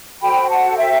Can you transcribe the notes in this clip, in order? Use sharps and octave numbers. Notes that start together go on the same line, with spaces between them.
F#4 A4 C5 G5 B5
F#5 A5
E5 G5